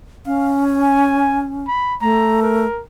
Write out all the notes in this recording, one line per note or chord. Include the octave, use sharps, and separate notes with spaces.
C#4 F5
G#5
B5
A3 A#5
A#4